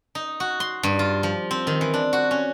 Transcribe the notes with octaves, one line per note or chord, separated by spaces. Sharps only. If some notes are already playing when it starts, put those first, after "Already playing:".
D#4
F#4
C6
G2
F4
F3
C4
D#3
E3
D4
F#4
C#4